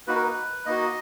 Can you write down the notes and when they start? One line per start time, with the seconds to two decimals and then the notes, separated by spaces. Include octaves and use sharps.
0.07 A#3 D#4 F#4 B4
0.15 A#4
0.24 B4
0.66 A#3 D#4 F#4 D#5